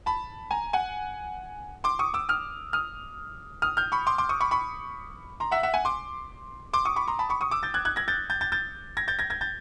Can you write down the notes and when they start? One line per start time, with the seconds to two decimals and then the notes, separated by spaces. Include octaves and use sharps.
0.06 A5 B5
0.51 G#5 A#5
0.73 F#5 G#5
1.84 C6 D6
1.99 C#6 D#6
2.14 D6 E6
2.29 D#6 F6
2.73 D#6 F6
3.62 D#6 F6
3.77 F6 G6
3.92 B5 C#6
4.07 C6 D6
4.18 C6 D6
4.29 C#6 D#6
4.41 B5 C#6
4.51 B5 C#6
5.40 A#5 C6
5.51 E5 F#5
5.63 E5 F#5
5.74 F#5 G#5
5.85 C6 D6
6.73 C6 D6
6.85 C#6 D#6
6.96 B5 C#6
7.08 A#5 C6
7.19 A5 B5
7.29 B5 C#6
7.41 C#6 D#6
7.51 D6 E6
7.63 G6 A6
7.74 F#6 G#6
7.85 F#6 G#6
7.96 G#6 A#6
8.08 G6 A6
8.30 G6 A6
8.41 G6 A6
8.52 G6 A6
8.97 G#6 A#6
9.08 G6 A6
9.19 G#6 A#6
9.30 G#6 A#6
9.41 G6 A6